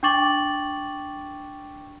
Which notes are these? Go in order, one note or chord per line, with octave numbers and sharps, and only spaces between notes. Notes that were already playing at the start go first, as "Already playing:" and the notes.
D4 G5 C#6 D6 A6 F#7